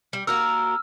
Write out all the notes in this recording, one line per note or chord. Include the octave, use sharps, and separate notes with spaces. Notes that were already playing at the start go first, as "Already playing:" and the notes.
G3
A#3 F#4 A#4 E6 F6